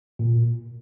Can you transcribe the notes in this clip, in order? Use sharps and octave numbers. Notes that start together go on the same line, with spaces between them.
A#2